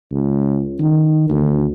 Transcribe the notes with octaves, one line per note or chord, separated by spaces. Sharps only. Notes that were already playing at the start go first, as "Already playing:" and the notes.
C#2
D#3
D2